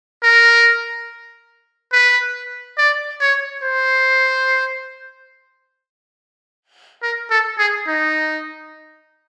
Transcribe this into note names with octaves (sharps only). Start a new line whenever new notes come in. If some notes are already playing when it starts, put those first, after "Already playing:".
A#4
B4
D5
C#5
C5
A#4
A4
G#4
D#4